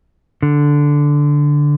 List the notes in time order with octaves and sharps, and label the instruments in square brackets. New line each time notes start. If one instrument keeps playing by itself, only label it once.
[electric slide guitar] D3